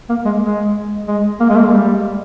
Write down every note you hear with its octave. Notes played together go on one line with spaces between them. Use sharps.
A#3
G#3
G#3
G#3
A#3
G#3
A#3
G#3
G3